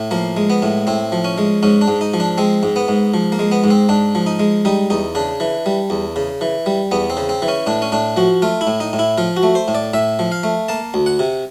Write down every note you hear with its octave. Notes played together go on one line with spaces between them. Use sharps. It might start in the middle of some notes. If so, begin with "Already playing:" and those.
Already playing: A2
F3 A#3
G#3
B3
A2
A2 C4
F3
C#4
G#3
G#2 C#4
D4
G#2
D#4
F3
D4
G#3 C4
G#2
B3
G#2
F3
A#3
G#3
B3
G#2
C4
G#2 D4
F3
D#4
G#3
G3 D#4
E2 D#4
C#3 D4
E3
G3
E2
C#3
E3
G3
E2 B3
C4
C#3
C4
E3
C#4
A2 D4
C#4
A2 D4
F3 F#4
A3 F4
E4
A2
D#4
A2
E4
F3 F4
F#4
A3
C5
A2
D5
A2 E5
F3
F5
A3
A#3 A5
D2
F#5
C3